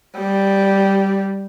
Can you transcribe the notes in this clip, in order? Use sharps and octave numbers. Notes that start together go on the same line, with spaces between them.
G3